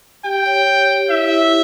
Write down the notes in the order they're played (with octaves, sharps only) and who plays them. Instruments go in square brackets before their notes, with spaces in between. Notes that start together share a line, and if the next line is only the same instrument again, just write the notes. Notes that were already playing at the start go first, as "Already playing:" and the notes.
[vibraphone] G4 [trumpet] G5
[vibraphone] C#5
C#5
G4
[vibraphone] E4 [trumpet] E5
[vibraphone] E4